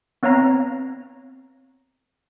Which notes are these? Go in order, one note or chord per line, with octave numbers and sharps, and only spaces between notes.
B3 C4 C#5 F5 A#5 A#6